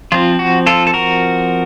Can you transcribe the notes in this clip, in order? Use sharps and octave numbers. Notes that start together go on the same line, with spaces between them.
F3 C4 F4
F#4
F4 A4
A4
F#4 A#4